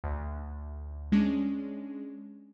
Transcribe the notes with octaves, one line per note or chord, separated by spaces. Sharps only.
D2
G#3 C#4 D4